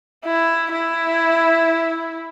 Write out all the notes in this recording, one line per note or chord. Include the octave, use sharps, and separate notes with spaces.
E4
E4